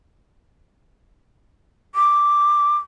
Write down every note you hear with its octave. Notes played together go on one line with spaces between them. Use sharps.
D6